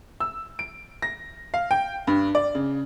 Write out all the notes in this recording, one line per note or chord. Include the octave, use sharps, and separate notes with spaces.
E6
D7
A#6
F5
G5
G2
D5
C#3